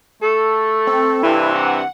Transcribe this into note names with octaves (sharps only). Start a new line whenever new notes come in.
A3 A4
C4
G2 C3 E3 E4
F#5